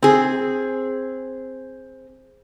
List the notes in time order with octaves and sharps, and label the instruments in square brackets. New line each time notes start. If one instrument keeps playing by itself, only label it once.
[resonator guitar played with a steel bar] C4 G#4